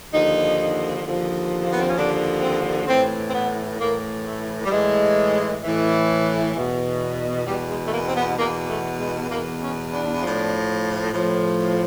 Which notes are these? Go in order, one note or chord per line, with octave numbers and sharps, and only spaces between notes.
D#2 D3 F3 D#4
D#2 D3 F3
A#3
B3
C4
C#4
D#2 D3 F3 D4
C4
A2 E3 C4
C4
B3
A2 E3 A#3
A3
G3
A2 E3 G#3
A2 E3
E2 B2
E2 B2 G3
G#3
A3
A#3
C4
B3
E2 B2 A#3
A3
G#3
E2 B2 A#3
C#4
D4
A2 F3
A2 F3